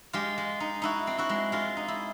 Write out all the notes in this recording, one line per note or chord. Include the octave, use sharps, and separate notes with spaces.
G#3 F4 G4
G#3
D#4
D#4 E4 F#4
C4
E4 F#4
G#3
G#3 F4
D#4
E4